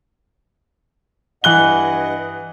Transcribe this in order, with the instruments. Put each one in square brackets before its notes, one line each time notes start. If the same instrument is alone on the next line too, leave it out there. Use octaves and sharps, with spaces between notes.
[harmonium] G2 D#5 F#5 [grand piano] E3 F#6 G7